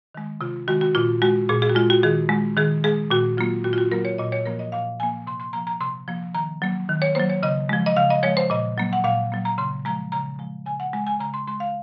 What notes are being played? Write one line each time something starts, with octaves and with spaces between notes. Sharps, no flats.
D#3 G#3
C3 F4
D#3 G#3 F#4
F#4
A#2 F4
G#3 F#4
A#2 G#4
G#4
F#4
G#3 F4
F#4
D#3 G#4
G#3
D#3 G#4
G#3 G#4
A#2 F#4
F#3 A#3 F4
A#2 F#4
F4
F#4
F#3 A#3 A#4
C#5
A#2 D#5
C#5
F3 A#3 A#4
D#5
A#2 F5
F3 A#3 G#5
C3 C6
C6
F3 A#3 A#5
A#5
C3 C6
F3 A#3
D#3 A#5
F#3 A#3
D#3
C#5
F#3 A#3 C5
C#5
C#3 D#5
F3 G#3
D#5
C#3 F5
D#5
F3 G#3 C#5
C5
A#2 D#5
F#3 A#3
F#5
A#2 F5
F#3 A#3
A#5
C#3 C6
F3 G#3 A#5
C#3 A#5
F3 G#3
C#3 G#5
F#5
G#3 G#5
G#5
C#3 A#5
C6
G#3 C6
F5